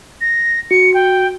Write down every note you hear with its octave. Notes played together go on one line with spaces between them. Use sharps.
A#6
F#4 C#7
G5